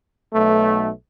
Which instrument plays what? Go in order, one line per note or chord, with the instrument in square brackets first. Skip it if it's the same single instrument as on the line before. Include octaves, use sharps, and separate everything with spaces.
[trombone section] B1 A3